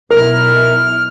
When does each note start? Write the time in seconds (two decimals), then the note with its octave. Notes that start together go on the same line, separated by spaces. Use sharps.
0.11 B1 B2 E4 A#4 F6